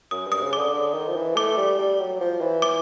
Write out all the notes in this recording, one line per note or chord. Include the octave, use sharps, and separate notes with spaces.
F#2 D#6
G2
D#6
C#3
D3 D6
D3
D#3
F3
E3
A3 D6
G3
G3
F#3
F3
E3
D6